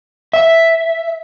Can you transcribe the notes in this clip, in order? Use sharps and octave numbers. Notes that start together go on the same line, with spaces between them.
E5